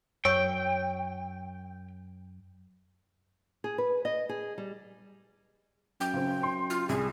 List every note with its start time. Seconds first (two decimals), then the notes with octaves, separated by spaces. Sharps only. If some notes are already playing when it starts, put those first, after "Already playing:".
0.25 F#2 C#5 G5 C#6 E6
3.64 G#4
3.78 B4
4.05 D#5
4.29 G#4
4.58 G3
6.00 F#2 G5
6.14 C#3 C4
6.43 C6
6.70 F4
6.89 C2 G#4